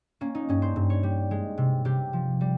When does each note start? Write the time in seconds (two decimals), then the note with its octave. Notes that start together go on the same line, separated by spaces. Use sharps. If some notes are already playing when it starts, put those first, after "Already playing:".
0.21 A#3 C#4
0.35 D#4
0.49 G2 C#4
0.62 C5
0.76 G2
0.90 C#5
1.03 G3
1.31 G#3
1.58 C3
1.85 C3 G4
2.13 F3
2.41 G3